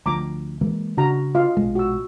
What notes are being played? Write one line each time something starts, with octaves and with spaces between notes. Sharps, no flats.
D2 F3 A#5 D6
E3 G#3 A#3
C#3 D4 F#4 A#5
F4 D#5 F5
A#1 B2 G#3
F#4 E6